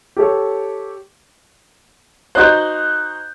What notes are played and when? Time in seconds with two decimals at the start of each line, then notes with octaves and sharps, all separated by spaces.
0.16 G4 A4 C#5
2.35 D#4 F#4 C5 F#6 G6